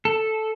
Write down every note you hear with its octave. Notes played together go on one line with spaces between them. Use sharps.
A4